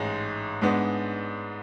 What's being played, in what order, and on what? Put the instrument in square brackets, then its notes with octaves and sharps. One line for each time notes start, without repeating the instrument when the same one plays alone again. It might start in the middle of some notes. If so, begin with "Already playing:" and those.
Already playing: [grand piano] A1 G#2 G#3
G#2 G#3 B3 D4